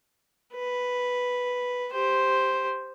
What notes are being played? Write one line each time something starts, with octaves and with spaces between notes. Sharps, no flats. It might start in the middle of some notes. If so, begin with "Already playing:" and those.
B4
G4 C5